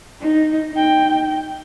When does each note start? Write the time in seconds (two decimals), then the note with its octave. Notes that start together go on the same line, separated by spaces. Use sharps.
0.21 D#4
0.72 D#4 G5